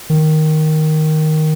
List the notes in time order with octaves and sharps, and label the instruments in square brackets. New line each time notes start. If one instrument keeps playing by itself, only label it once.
[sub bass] D#3